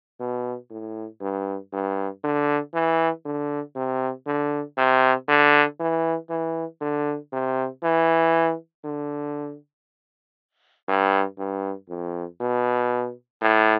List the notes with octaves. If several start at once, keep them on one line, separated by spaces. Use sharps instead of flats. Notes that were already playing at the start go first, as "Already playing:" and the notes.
B2
A2
G2
G2
D3
E3
D3
C3
D3
C3
D3
E3
E3
D3
C3
E3
D3
G2
G2
F2
B2
A2